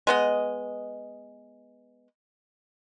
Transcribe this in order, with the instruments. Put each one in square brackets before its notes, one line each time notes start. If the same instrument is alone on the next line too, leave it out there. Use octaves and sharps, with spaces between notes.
[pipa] G#3 B3 D#5